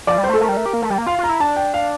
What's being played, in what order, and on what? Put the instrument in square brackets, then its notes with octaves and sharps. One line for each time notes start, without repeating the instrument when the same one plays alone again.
[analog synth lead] F3 [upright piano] D5
[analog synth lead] G3
[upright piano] C5
[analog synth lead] A3
[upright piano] A4
[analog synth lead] A3 [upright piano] A#4
[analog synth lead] G3
A3
G4
A#3
A3
G3
A#3
[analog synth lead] F4 [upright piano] F5
[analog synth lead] F4
[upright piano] A#5
[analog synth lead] E4
[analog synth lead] D4 [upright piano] A5
[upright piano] G5
F5